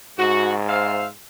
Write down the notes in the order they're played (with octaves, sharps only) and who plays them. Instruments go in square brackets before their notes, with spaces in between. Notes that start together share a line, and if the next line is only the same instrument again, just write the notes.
[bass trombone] G#2 [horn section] F#4
[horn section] C5 E5 F5